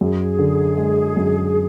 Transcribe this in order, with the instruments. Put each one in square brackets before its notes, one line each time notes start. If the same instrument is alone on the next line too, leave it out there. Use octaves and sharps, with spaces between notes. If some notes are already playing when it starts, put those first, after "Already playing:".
[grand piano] F#2 [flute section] G#4
[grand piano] D3
G#3
F#2